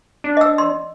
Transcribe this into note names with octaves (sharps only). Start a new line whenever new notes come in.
D4
D#5 E6
C6